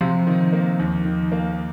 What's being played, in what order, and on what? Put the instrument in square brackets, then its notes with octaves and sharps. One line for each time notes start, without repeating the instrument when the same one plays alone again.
[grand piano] C3 [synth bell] F3
[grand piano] D#3
A#3
D#2
D#3
A#3